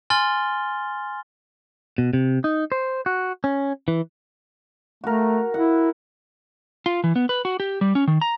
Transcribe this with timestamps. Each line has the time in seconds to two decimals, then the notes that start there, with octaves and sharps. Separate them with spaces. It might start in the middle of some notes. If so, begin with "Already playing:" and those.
0.10 G#5 C6 F6 A6 G7
1.98 B2
2.13 C3
2.44 D#4
2.72 C5
3.06 F#4
3.44 C#4
3.88 E3
5.04 A3 F#4 A#4
5.54 E4 F#5
6.86 F4
7.04 E3
7.16 B3
7.29 B4
7.45 F#4
7.60 G4
7.81 G3
7.95 C#4
8.08 D#3
8.21 A#5